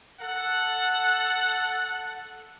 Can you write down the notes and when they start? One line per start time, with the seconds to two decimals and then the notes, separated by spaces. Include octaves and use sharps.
0.21 A4 F#5